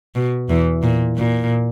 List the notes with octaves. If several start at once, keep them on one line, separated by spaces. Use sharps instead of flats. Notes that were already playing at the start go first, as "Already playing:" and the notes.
B2
E2 E3
A#2
A#2